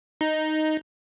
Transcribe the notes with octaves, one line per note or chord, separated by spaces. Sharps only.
D#4